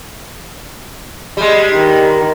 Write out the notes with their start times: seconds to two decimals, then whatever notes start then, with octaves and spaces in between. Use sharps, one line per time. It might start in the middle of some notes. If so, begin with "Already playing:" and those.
1.37 G3 G#3
1.74 D#3